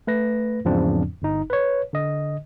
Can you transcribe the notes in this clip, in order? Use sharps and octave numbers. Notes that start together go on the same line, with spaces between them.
A3 B4 A#6
E2 G#2 C#3 F3 C4 D4
G1 D#4
B4 C#5
D3 D#5